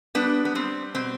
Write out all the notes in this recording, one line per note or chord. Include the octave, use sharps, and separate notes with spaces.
G3 B3 D4
B3
G3 C4
B2 C4